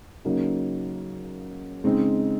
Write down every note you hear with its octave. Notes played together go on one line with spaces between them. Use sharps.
C#3 F#3 A#3 D#4
C#3 G#3 C4 D#4